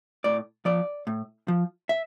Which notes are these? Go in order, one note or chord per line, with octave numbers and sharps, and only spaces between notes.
A2 D5
F3 D5
A2
F3
E5